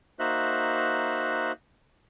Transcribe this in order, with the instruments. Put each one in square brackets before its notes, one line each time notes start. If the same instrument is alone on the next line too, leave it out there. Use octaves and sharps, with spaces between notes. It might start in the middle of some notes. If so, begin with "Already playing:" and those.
[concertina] A#3 D#4 F#4 C5 E5 F#6